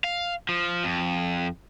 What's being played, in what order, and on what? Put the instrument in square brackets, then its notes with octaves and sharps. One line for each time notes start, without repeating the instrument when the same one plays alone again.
[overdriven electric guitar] F5
F3
F2